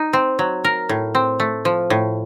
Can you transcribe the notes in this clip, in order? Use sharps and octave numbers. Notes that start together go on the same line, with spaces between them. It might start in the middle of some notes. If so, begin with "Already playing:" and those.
Already playing: D#4
C4
F#3
A#4
A2
C4
A3
F3
A2